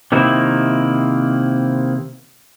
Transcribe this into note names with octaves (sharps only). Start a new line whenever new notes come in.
C3 D#3 A#3 E4